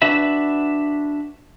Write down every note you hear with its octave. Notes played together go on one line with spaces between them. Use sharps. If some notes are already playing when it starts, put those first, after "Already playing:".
D4 F#4 B4 E5 B5